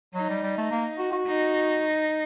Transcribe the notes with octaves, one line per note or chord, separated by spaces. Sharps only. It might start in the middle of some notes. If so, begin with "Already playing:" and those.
F#3 D#4
G3
G3
A3
A#3
F#4
F#4
D#4